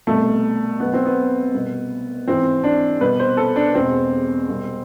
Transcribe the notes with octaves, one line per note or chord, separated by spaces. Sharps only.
C2 B2 A3
B1 B2 B3
C4
B3
C2 B2
G#1 G#2 E3 C4
D4
C2 B2 B4
C5
A4
D4
E1 E2 B2 C4
C2 B2